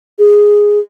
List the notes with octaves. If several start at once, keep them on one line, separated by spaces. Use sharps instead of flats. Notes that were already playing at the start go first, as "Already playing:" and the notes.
G#4